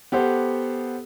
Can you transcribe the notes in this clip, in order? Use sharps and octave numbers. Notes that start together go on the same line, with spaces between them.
B3 G4 A4 C5 F#5